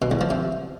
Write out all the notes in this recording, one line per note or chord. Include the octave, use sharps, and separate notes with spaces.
B2
E2
F3
C3